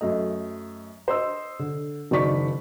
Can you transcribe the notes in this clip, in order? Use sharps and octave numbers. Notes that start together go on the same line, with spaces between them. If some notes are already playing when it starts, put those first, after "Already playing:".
F#2 A3 D#5
C5 D#5 E6
D3
F#1 B2 D#3 D5 C#6 B6